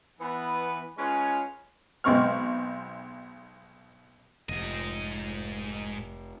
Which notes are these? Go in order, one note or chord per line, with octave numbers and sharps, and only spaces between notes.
E3 B3 B4
G#3 C#4 F4 B4 C#5
B1 G#3 C4 C#6 F6
F1 G#2 D#5